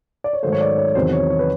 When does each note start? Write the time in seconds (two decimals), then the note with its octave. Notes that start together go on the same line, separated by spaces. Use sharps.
0.24 D5
0.33 C#5
0.43 G#2 D#3 F#3 A3 C5
0.52 C#5
0.61 D5
0.78 C#5
0.95 E2 C3 D#3 F#3 C5
1.12 C#5
1.30 C#5
1.39 B4